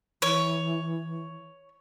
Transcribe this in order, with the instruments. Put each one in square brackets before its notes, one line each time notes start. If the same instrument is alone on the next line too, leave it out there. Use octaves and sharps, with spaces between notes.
[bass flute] E3 [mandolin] C#5